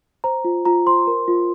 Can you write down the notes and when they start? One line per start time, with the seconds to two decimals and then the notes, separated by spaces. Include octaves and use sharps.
0.24 C5 A#5
0.44 F4
0.65 F4 A#5
0.86 C5 C6
1.07 A#4
1.28 F4